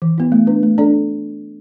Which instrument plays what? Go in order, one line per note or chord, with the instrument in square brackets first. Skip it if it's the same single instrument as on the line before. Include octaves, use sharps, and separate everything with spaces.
[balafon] E3
B3 E4
A3
D4 B4
A3
D4 A4 D5